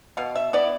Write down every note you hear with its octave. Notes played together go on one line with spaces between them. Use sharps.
B2 F5
E5
B3 E4 D5